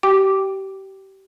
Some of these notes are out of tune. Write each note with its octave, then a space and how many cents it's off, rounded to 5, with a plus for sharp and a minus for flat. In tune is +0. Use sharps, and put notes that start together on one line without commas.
G4 -30 G5 +0 D6 +0